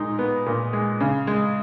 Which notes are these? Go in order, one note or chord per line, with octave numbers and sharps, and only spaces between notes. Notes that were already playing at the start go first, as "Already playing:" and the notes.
Already playing: A#2 G#3 D#4
B3
A#2
G#3
C#3
G#3